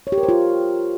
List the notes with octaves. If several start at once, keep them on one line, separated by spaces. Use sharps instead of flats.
C#5
G4
A#4
C5
F4